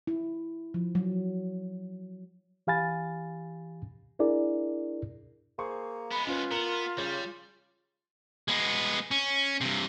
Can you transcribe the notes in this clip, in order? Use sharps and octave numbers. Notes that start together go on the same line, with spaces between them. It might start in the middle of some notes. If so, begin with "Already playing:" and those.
E4
F3
F#3
E3 G4 F5 G#5 B5 A6
D4 E4 G#4 A#4 D5
A#3 G#4 C5 C#6
G#3 B3 B5
C#4 F4 B4
B3 A#4 C#7 E7 F7
C#3 G3 C#5
G#3 B3
C#4
G2 C3